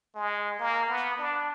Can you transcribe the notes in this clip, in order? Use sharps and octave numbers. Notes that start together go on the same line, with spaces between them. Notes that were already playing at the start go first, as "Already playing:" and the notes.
G#3
A#3
B3
D4